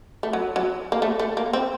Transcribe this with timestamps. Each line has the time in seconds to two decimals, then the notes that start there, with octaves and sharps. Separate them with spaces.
0.23 A3
0.33 F#3
0.56 F#3
0.92 A#3
1.02 A3
1.20 A3
1.37 A#3
1.53 C4